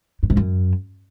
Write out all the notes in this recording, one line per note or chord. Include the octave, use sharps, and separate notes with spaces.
G2
G#2
F#2